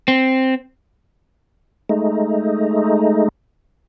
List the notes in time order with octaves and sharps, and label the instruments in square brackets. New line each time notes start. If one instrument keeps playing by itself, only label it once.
[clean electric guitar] C4
[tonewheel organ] G#3 A3 D#4